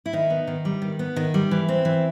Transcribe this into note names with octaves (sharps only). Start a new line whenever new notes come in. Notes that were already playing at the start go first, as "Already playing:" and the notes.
E4
D#3 D#4
B3
D#3
G3
D#3
B3
D#3
G3
E3
C4
E3